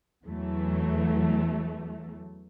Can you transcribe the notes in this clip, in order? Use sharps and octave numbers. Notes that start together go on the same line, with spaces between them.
E2 E3 F#3 A3